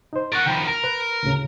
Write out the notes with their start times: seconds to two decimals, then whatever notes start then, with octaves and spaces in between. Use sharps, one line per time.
0.13 D#4 C5
0.32 A#4 F#5 C#6 A6
0.46 D#3 F3 G5 A#5 B5
0.67 A#4 A#5
0.84 B4
1.23 D2 A2 C#3